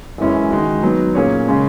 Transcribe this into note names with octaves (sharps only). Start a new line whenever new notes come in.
F#2 E3 G#3 C#4 E4
D#3 G#3 D#4 F#4
F#3 B3 D#4
A#2 A#3 C#4 G#4 C#5
C#3 G#3 C#4